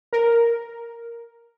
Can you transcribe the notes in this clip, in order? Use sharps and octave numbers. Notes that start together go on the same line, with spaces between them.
A#4